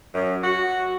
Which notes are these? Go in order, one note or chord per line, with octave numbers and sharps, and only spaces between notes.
F#2
F#4